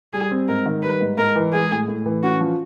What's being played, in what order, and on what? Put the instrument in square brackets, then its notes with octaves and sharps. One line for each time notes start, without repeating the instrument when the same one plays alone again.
[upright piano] G3 [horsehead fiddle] G#4
[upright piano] C4
[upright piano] G#2 [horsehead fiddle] A#4
[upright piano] D#3
[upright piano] G3 [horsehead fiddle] B4
[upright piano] G#2
[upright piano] G#2 [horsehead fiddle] A#4
[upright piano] E3
[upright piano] G#3 [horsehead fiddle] G#4
[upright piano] A2
A2
E3
[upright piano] C#4 [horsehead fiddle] F#4
[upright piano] F3